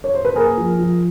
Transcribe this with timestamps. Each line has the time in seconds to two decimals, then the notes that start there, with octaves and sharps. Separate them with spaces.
0.04 C#5
0.14 C5
0.25 B4
0.36 A#3 G#4 A#4
0.57 F3
0.79 F3